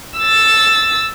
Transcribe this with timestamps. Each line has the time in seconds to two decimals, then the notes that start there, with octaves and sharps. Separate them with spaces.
0.18 E6 A6